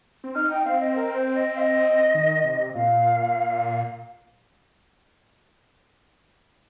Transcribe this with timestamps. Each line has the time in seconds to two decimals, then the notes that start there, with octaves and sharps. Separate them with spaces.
0.24 C4
0.35 D#4 F6
0.50 G5
0.65 C4 F5
0.80 D#5
0.96 A#4
1.15 C5
1.35 D#5
1.56 F5
1.60 D#5
2.15 D#3
2.44 C3
2.74 A#2 F5